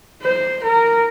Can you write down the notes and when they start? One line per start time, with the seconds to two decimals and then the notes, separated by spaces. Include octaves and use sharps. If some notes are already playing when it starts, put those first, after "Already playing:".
0.23 C5
0.63 A#4